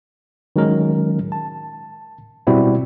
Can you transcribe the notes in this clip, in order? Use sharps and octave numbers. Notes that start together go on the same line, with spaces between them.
D#3 F#3 G#3 C#4 A#4
A5
B2 G3 C4 E4 F#4